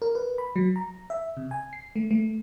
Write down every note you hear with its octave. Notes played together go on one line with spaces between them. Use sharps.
A#4
B4
B5
F#3
A#5
E5
C3
G#5
C7
A3
A3